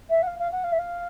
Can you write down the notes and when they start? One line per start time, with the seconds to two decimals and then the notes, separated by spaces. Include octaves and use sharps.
0.09 E5
0.22 F#5
0.27 F5
0.39 F5
0.51 F#5
0.64 F5
0.72 E5
0.78 F5